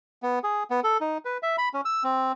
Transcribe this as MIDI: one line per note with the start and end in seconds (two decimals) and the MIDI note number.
0.23 0.39 59
0.44 0.63 68
0.70 0.80 59
0.84 0.97 69
1.01 1.18 63
1.25 1.38 71
1.43 1.56 76
1.58 1.69 83
1.74 1.81 61
1.85 2.03 88
2.03 2.32 60